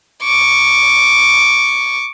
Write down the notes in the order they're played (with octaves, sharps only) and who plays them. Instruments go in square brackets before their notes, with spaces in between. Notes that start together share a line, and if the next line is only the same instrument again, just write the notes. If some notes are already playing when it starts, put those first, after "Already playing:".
[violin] C#6 D6